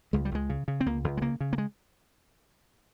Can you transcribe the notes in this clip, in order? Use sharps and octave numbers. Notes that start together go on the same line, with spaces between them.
C#2 G#3
G3
C#2 G#3
C#3
C#3
C4
C#2 A#3
C#2
G#3
C#3 A#3
C#3
A#3
G#3